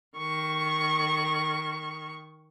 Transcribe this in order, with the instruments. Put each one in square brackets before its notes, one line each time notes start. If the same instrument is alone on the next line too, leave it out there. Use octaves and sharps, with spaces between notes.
[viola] D#3 C#6